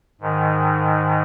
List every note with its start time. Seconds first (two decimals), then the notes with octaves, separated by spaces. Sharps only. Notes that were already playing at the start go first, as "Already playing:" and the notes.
0.21 G#2 D#3